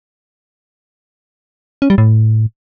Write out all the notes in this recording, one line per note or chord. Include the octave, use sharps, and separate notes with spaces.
C#4
G3
A2